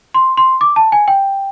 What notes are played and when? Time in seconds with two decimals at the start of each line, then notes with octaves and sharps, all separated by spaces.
0.14 C6
0.37 C6
0.61 D6
0.76 A5
0.92 G#5
1.08 G5